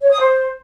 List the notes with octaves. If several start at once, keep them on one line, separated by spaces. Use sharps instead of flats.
C#5
D#6
C5